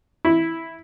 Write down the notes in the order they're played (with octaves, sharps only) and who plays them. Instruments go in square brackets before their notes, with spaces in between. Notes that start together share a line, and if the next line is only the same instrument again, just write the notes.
[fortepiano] E4